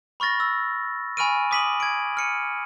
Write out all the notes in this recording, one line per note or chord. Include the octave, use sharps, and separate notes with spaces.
B5 C#6 F6 A6 A#6
E6
G#5 B5 C#6 F6 D7 D#7
D6 D#6 B6 D#7 F#7
G#6 D7
F6 C#7 D#7